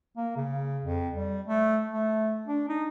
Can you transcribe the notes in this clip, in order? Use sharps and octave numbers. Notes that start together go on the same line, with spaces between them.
A#3
C#3
F2
G3
A3
A3
D4
D#4